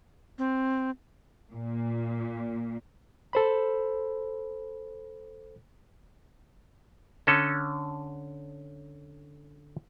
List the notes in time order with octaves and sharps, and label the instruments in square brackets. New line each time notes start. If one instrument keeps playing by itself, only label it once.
[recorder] C4
[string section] A#2
[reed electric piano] A4 C5 B5
[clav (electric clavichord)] D3 C#4 A4